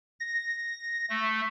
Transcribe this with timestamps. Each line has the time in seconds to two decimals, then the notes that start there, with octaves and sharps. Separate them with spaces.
0.20 A#6
1.10 A3